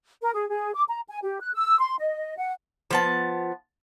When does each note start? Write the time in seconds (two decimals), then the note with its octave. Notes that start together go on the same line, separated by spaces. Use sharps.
0.21 A#4
0.34 G#4
0.49 G#4
0.74 D6
0.88 A#5
1.08 G#5
1.23 G4
1.40 F#6
1.54 E6
1.79 C6
1.99 D#5
2.38 F#5
2.91 F3 B3 A5